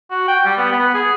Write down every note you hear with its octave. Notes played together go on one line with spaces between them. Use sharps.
F#4
G5
G3
B3
B3
G#4